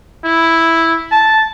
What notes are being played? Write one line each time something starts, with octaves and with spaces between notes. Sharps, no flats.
E4
A5